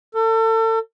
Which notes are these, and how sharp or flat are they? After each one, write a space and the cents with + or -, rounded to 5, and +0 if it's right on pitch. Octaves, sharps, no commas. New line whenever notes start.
A4 +35